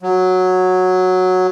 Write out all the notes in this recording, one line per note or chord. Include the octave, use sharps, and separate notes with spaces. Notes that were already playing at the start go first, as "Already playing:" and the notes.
F#3